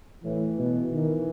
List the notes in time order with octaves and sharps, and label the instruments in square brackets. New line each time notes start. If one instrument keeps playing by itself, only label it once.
[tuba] A2 [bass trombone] E3
[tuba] B2
D#3